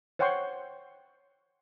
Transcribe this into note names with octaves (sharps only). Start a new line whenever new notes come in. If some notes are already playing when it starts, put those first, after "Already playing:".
C5 C#5 F#5 G5 C6 C#6